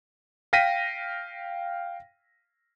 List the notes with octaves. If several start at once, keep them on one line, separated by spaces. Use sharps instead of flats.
F5 G5 A#6 B6 D#7